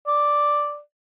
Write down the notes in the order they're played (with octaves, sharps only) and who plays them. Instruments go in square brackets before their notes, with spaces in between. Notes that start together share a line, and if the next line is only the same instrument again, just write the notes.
[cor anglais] D5